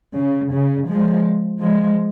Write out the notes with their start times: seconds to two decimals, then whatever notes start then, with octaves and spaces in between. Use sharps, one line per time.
0.16 C#3
0.53 C#3
0.89 F3 G#3
1.61 F3 G#3